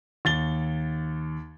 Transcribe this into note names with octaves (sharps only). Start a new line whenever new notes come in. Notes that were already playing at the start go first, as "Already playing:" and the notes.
D#2 A6 G7